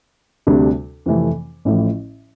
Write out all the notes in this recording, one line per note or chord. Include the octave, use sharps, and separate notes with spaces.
D2 C3 G3 D4
F2 C3 E3 A3
A1 A2 F3